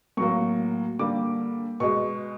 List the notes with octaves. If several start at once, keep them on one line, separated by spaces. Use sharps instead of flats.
A2 F#3 A#3 C#6
D3 G3 A#3 D6
B2 G#3 C#6